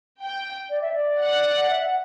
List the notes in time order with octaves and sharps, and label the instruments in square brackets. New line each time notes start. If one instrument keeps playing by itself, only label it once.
[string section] G5
[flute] D5
E5
D5
[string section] F#5
[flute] E5
F#5